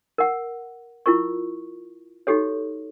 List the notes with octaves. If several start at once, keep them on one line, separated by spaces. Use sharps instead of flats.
A#4 F#5
E4 F4 A#4 C#6
D#4 F#4 G4 A4 C#5